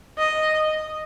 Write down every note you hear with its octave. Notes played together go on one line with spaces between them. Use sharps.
D#5